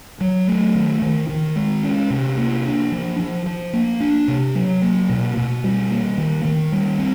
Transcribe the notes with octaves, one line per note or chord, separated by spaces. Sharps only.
F#3
A3
D#3
D#3
D#3
G#3
C#4
C3
A#3
D4
F3
F3
F3
A#3
D4
C3
F#3
A#3
B2
B2
G3
A#3
D#3
D#3
G3
C4